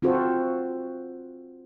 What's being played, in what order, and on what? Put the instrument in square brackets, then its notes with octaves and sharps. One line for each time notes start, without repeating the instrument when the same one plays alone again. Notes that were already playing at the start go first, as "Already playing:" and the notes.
[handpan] C4 F4 F#4 A4 C5